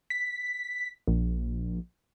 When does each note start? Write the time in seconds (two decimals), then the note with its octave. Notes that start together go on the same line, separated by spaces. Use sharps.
0.10 B6
1.08 A#1